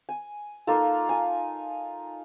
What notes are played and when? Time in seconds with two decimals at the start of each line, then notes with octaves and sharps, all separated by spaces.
0.09 G#5
0.67 A#3 D#4 F4 A4
1.09 G#5 A5